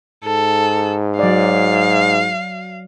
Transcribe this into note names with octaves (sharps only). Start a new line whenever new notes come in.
G#2 A4
F#3 D5 F5